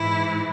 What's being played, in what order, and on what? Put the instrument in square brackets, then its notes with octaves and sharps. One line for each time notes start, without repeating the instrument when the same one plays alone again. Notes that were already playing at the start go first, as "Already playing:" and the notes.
Already playing: [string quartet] G#2 E3 E4